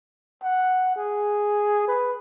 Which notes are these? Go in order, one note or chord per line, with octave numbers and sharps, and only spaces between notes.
F#5
G#4
B4